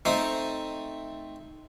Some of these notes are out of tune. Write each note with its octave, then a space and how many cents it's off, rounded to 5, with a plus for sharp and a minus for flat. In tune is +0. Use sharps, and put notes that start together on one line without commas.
A3 +0 C4 +0 D#4 +0